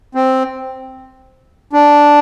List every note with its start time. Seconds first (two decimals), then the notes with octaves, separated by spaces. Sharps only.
0.15 C4
1.73 D4